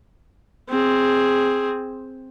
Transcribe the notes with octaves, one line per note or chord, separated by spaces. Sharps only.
C4 G#4